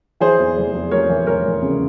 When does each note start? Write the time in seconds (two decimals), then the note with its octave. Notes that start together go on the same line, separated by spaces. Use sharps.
0.20 E3 G#4 C5
0.39 E2
0.57 F1
0.75 E2
0.91 F1 A#4 C#5
1.10 E3
1.27 F1 A#4 C#5
1.45 F1
1.62 C#3